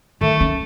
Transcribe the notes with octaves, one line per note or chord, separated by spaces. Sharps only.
D#3 A3
C#4